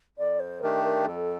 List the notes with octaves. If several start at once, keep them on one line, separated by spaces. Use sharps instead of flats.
F2 D5
C5
D#3 A3 D4 G4 A#4
A#4
F2 A4